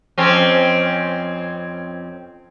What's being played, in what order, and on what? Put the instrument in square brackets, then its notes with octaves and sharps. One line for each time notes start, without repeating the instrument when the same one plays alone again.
[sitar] F2 C4 C#4